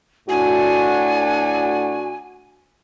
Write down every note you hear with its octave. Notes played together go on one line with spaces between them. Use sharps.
A2 D4 F#4 G#5